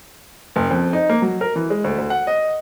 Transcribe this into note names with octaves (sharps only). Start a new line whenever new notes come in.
F#1
F2
D#4
A#3
F#3
A#4
E3
G#3
D2
D2
F#5
D#5